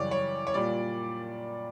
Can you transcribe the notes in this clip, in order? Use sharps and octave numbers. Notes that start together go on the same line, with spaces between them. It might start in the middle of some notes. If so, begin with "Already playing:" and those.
Already playing: F#2 C#3 E3 G3 C#5 D5
C#5
C#5
A#2 G3 D5